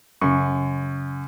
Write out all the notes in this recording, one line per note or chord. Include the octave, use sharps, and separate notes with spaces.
F#2 C#3 C#6